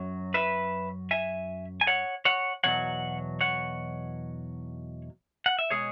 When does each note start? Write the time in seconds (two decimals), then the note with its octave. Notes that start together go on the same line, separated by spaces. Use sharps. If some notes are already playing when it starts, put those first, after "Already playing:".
Already playing: F#2 F#3
0.34 B4 E5
1.11 E5 G#5
1.81 G#5
1.87 C#5 F#5
2.25 C#5 F#5
2.64 E2 B2 F#3 C#5 F#5
3.41 C#5 F#5
5.46 F#5
5.59 E5
5.70 B2 G#3 G#4 C#5